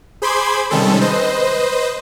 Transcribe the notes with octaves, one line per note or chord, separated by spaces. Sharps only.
G#4 C5 B5 C6 D6 G#6
C3 D#3 G3 G#3 C#4 A4
B4 C5 D#5